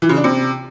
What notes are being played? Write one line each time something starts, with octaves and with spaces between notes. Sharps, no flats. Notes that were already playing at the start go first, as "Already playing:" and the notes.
E3
C#3
D4
C3